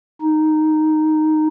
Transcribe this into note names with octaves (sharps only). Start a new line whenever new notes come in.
D#4